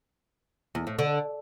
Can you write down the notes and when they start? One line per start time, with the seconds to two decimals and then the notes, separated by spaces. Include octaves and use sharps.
0.75 E2
0.87 A2
0.99 D3